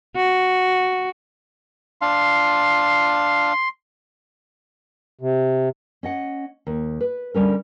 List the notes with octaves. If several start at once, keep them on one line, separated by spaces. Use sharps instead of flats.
F#4
D4 F5 C6
C3
C#4 D#5 F#5
D#2
B4
D3 G3 C#4 A#4